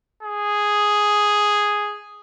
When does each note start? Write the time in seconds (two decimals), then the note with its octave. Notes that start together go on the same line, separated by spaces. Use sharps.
0.23 G#4